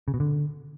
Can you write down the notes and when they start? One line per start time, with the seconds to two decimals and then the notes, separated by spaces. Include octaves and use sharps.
0.08 C#3
0.14 B2
0.20 D3